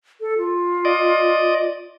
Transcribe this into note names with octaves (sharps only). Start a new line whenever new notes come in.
A4
F4
D5 D#5